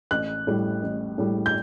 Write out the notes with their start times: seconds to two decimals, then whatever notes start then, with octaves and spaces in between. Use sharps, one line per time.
0.11 A1 F#6
0.47 A2 G3
0.82 A1
1.18 A2 G3
1.46 G6